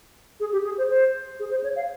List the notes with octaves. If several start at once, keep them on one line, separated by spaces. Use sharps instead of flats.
G#4
G4
G#4
C5
C5
G#4
C5
C#5
F5